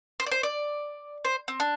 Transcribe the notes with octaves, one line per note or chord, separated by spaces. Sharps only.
C5
D5
C5
D5
C5
C4
D4